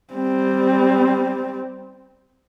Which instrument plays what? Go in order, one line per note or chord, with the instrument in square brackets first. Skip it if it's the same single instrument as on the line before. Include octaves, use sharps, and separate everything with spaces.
[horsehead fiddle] G3 C4